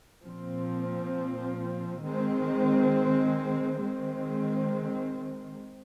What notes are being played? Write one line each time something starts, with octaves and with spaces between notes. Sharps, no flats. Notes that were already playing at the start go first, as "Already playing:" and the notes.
A#2 F3 C4
D#3 G#3 C4
D#3 G#3 C4